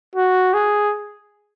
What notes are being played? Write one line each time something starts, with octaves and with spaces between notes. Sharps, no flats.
F#4
G#4